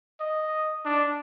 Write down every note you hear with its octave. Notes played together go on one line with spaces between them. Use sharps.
D#5
D4